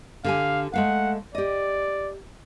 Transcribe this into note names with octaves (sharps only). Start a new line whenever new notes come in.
D3 G4 F5 G#5
G#3 A3 F5 F#5
G4 D5 D#5